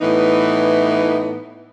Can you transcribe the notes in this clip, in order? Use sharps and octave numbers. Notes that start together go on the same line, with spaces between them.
A2 E3 B3 D#4